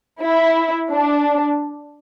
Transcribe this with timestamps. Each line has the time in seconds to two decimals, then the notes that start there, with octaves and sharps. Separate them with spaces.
0.22 E4
0.92 D4